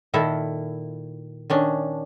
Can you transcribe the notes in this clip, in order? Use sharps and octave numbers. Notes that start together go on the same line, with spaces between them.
A#2 D#3 E4 A4
D#3 C#4 D4